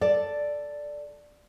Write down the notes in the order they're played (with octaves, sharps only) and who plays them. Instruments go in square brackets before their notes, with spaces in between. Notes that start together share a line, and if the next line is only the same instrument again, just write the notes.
[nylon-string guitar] A4 D5